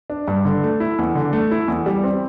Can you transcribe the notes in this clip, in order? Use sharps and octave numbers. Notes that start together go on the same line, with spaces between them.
D4
G2
D3
A3
E4
E2
D3
A3
E4
E2
G3
C4